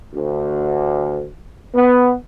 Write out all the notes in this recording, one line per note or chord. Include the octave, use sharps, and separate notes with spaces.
D2
B3